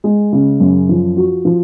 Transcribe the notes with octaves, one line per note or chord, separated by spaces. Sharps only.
G#3
C#3
F#2
F3
F#4
F3